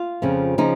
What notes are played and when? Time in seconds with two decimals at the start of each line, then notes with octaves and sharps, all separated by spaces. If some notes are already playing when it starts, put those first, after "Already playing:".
Already playing: F4
0.22 F2 C#3 F3
0.58 C#3 F3 D#4